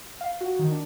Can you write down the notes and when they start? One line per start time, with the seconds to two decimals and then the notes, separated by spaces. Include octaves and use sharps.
0.21 F5
0.41 F#4
0.59 D#3
0.72 D4